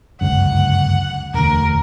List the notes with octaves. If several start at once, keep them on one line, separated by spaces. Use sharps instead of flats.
G1 C#2 F#2 F#5
E1 D2 A#4